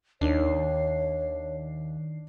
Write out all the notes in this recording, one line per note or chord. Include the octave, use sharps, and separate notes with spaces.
D#2 D#3 D4 C#5 C7